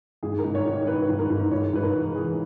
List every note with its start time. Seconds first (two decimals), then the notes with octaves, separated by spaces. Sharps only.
0.23 G#2 G#4
0.39 A#4
0.44 G#2
0.55 C#5
0.66 D#3
0.71 C#5
0.87 D#3 B4
1.08 G#2
1.19 A#4
1.30 G#2
1.51 G#2 C#5
1.73 G#2 B4
1.83 A#4
1.95 E3
2.15 E3 G#4